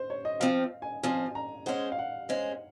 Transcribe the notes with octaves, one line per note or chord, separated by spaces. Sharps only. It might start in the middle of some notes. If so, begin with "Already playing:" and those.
Already playing: C5
C#5
D#5
F3 C4 F4 F5
G#5
F3 C4 F4 G#5
A#5
G#3 C#4 G#4 C5 F#5
F5
F#5
G#3 C#4 G#4 C5